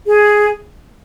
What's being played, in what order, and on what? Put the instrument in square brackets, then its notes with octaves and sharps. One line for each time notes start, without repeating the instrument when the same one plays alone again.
[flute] G#4